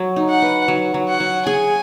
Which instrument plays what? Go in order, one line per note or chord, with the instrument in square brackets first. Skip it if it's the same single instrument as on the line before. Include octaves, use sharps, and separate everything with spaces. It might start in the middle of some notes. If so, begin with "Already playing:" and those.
Already playing: [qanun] F#3
D#4
[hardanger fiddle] F#5
[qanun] B4
F#3
F#3
[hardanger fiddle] F#5
[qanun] F#3
[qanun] G#4 [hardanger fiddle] G#5